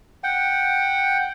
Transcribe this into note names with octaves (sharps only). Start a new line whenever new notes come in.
F#5 G5